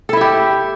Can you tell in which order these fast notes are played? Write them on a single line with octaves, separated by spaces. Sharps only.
A4 E4 E5 G4